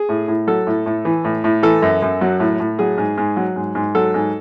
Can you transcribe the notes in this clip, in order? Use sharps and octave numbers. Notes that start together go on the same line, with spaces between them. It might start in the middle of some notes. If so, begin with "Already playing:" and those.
Already playing: G#4
A2
A2
F#3 A4
A2
A2
E3
A2
A2
E3 A4
F#2
F#2
F#3
A2
A2
F#3 G#4
G#2
G#2
F#3
G#2
G#2
F#3 A4
G#2